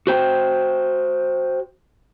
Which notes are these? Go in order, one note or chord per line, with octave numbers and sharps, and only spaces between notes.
F#4 C5 G5